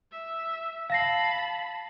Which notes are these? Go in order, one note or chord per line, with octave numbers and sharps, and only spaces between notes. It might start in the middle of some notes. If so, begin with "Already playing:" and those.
E5
F5 A5 B5 A#6 C7